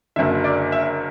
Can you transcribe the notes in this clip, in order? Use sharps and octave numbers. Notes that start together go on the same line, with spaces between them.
F#1 F#2 D3 E5
D5
E5